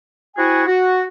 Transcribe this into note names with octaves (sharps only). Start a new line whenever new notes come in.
C4 E4 F#4 G#4 F#5 G#5
F#4